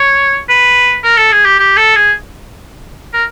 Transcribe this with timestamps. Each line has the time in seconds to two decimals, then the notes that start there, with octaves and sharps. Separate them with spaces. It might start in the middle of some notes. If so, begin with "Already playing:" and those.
Already playing: C#5
0.49 B4
1.04 A#4
1.18 A4
1.32 G#4
1.45 G4
1.59 G4
1.77 A4
1.95 G#4
3.13 A#4